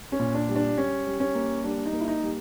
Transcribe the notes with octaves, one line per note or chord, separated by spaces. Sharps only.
C#4
A#2
D4
G3
D4
G3 C#4
G3
C#4
A#3
G3 D4
D#4
A#3
E4
D#4
G3